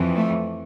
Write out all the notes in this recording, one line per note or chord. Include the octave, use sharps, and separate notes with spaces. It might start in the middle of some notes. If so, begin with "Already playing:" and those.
Already playing: F2 E3
A3